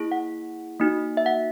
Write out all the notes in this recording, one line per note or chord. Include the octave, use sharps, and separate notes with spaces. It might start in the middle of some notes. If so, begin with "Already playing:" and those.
Already playing: A#3 E4 G#4
F#5
A#3 D#4 F#4
E5
F#5